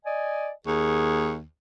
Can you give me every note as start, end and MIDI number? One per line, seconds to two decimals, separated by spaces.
0.05 0.50 74
0.05 0.50 75
0.05 0.50 80
0.67 1.43 39
0.67 1.33 68
0.67 1.33 85